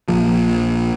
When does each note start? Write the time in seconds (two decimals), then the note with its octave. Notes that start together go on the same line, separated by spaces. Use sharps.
0.08 A#1 A#2 F3